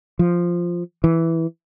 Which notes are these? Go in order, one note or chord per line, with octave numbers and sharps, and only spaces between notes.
F3
E3